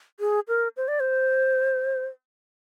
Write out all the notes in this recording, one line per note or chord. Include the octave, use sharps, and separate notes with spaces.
G#4
A#4
C5
D5
C5